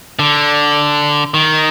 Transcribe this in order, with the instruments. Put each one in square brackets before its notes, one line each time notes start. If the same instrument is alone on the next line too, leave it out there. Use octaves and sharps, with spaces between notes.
[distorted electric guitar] D3
D#3